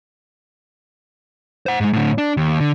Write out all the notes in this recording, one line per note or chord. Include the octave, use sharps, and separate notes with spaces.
C5 F#5
G#2 G#3
A2 D3
D4
D#2
D3